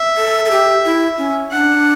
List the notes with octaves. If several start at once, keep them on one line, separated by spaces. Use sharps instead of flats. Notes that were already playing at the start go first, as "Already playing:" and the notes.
Already playing: E5
A4
A4
G4
E4
C#4
D4 F#5